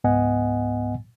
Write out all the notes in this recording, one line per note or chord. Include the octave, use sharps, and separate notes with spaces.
C#2 G#2 B3 D#5 F#5 G#5